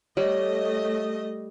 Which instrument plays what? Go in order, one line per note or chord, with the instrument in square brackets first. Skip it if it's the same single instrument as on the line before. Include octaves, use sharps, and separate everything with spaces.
[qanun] G3 [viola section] A3 D#5 [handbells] C#5